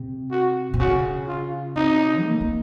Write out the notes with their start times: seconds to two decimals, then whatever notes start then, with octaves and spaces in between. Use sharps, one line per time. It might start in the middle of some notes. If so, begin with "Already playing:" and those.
Already playing: C3
0.31 F#4
0.74 C3
0.80 C#3 F#4
1.27 F4
1.76 C3 D#4
2.24 A#3
2.41 A#3